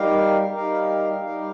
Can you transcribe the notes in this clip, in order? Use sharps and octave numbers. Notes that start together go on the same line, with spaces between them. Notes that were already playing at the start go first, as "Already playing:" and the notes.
Already playing: G3 D#4 G4 A#4 F5
G3 D#4 G4 A#4 F5
G3 D#4 G4 A#4 F5